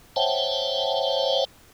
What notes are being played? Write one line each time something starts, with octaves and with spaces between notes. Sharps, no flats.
C5 C#5 E5 F#5 G5 A5